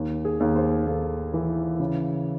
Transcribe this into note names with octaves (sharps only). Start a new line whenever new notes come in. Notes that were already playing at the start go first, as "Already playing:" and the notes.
Already playing: D#2
G#4
D#2
C5
D#2 A4
E3
C#3